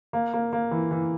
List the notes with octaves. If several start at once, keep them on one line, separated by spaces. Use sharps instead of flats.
A#3
A#3
A#3
E3
E3